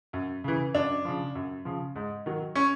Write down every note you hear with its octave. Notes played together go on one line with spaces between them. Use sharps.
F#2
C#3 E3
F#2 D4
C#3 F3
F#2
C#3 F3
G#2
D#3 F#3
C#4